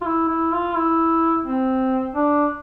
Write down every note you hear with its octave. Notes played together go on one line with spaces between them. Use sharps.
F4
E4
E4
F4
E4
C4
D4